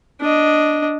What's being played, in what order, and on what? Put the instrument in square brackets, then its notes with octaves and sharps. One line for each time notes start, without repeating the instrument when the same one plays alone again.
[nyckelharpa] D4 D#5